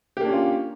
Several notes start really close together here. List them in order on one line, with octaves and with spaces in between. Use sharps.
G4 A#3 D4 C#4 F4